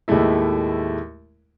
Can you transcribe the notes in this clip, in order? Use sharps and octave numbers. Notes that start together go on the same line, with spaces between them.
D#2 A2 G#3 A3 E4